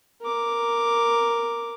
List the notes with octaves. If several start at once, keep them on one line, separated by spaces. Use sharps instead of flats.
A#4 D6